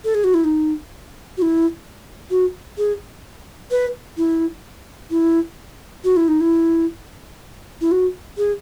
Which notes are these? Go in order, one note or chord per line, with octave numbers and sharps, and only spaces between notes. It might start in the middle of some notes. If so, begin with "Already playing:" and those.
A4
G#4
F#4
E4
D#4
F#4
E4
F#4
G#4
B4
E4
E4
F#4
E4
D#4
E4
E4
F#4
G#4